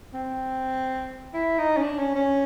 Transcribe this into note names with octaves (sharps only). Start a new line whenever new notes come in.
C4
E4
D#4
C#4
D4
C#4
C#4